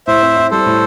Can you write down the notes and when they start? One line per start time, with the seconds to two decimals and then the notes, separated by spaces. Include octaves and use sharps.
0.07 A2 C5 E5
0.22 C4
0.36 E4
0.51 G3 A4 C5
0.66 A2